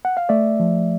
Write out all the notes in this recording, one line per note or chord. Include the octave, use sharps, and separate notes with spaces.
F#5
F5
A3 D5 E5
F3